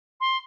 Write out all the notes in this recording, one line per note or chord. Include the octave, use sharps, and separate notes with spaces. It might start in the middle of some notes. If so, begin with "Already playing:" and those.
C6